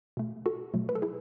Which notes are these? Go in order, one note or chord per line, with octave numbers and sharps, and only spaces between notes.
B2 A3
F#4 A4
B2 F#3 A3
B4
A4
E4 G#4